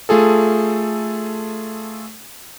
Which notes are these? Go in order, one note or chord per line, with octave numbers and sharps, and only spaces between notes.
A3 F4 G#4 A4